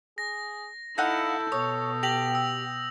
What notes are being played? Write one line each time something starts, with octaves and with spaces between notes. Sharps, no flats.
G#4 A#6
D#4 E4 A4 F5 F#5 G6
B2 C#5 D#6
G4 A#6 F7 F#7
E6